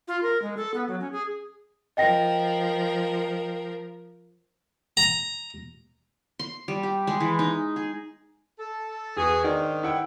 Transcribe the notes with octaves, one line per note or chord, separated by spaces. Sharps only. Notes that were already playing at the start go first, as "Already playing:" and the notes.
F4
A#4
G#3
A4
B3
F#3
C#4
G#4
F3 A#4 D#5 G5 A#6
A#5
C6
G3
G4
G#3
E3
D#4
G#4
A4
E2 F#4 G#4 D#6
G#2 D#3 D4
E4 F#5 G5